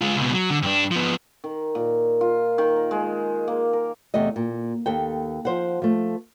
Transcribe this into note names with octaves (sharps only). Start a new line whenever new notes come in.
G#3 F4
C#2 B2
F#3
D3
G2 D4
F3 B3
D#3
A#2
F4
D#3
A#5
G#3
A#3
A#4
E2 C3 A3 D#5
A#2
D#2 A4 G5
F3 C5 F#5
F3 A3